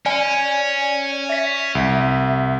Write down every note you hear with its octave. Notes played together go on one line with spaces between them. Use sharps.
C#4 D5 G#5
E5 B6
C2